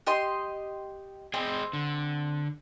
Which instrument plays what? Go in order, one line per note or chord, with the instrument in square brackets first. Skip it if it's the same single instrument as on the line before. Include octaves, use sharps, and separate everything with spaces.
[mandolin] G4 D#5 C6
[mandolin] C4 [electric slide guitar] G#4 D#5 G5
[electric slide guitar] D3